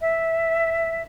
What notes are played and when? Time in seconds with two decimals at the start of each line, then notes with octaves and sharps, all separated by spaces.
0.01 E5